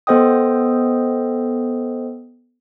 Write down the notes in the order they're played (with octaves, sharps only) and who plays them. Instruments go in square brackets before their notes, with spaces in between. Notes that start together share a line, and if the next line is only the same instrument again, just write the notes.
[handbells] B3 A4 C5 D#5 G5 D#6